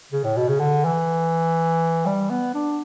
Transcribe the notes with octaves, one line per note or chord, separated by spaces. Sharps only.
C#3
A2
B2
C#3
D3
E3
G3
B3
D4